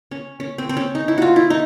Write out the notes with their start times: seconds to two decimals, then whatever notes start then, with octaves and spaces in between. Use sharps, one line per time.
0.11 C#4
0.40 C#4
0.58 C4
0.69 C4
0.77 C#4
0.95 D#4
1.08 E4
1.18 F4 F#4
1.36 E4
1.50 D#4